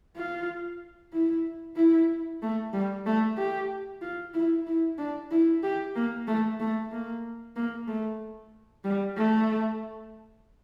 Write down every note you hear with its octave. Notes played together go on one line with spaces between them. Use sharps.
F4
E4
E4
A3
G3
A3
G4
F4
E4
E4
D4
E4
G4
A#3
A3
A3
A#3
A#3
A3
G3
A3